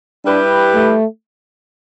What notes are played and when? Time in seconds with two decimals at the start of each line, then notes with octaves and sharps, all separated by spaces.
0.25 G3 D4 E4 G4 B4
0.75 A3